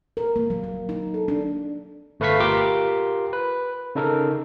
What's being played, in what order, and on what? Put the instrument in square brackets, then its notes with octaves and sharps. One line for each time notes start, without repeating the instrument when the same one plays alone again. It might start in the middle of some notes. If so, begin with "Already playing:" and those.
[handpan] A#4
A#3
F#3
F#3
D#4
A4
D4
[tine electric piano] G1 A3 B4 F5 C#6 B6
F4 G4 A#4 C6 D6
B4
C#3 D#4 A4 A#4